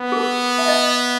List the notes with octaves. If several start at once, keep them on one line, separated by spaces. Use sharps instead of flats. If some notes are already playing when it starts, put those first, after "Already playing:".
Already playing: B3
G#4
A#4
E5
D#5